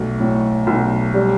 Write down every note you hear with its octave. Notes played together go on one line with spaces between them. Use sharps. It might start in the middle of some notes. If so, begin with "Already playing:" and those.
Already playing: B1 A3
A2
B1
G3